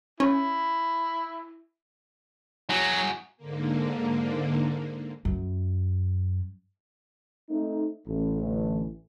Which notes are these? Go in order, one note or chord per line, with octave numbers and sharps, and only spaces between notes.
C#4 E4
F#3 F#4 G#4
G#2 D3 A#3
F#2
A3 C4 D#4
A1 A3
D3 E3 A3